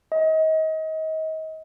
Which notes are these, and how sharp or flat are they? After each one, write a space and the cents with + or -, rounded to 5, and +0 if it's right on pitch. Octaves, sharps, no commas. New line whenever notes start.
D#5 +30